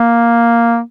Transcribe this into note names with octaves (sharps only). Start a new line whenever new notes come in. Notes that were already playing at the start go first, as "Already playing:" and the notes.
Already playing: A#3